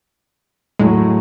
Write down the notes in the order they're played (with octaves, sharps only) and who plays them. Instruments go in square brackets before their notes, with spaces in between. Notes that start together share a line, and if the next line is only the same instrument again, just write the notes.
[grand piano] A2 F#3 A3 [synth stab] G#3